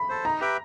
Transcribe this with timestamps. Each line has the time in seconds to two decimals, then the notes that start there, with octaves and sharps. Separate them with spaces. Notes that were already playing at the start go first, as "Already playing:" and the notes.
Already playing: B5
0.09 A4 C5
0.25 D#4 A#5
0.41 G4 B4 E5 G5